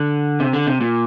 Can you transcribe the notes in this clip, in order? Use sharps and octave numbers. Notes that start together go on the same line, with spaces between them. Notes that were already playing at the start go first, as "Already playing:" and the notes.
Already playing: D3
C3
D3
C3
A#2